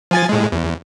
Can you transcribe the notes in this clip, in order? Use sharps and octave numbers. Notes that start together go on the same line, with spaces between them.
F3 G#5 A6
A2 G#3
E2